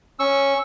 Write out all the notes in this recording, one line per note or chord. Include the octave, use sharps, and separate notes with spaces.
C#4 C#6 E6